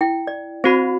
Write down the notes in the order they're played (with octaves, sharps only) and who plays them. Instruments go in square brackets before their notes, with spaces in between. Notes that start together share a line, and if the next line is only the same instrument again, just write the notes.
[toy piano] E4 G5
D5
[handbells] C4 F#4 [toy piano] C5 B5